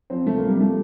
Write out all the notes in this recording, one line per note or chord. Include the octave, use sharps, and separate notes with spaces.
F3 C4
C3 A3
A#3
C3
G3
F3 A3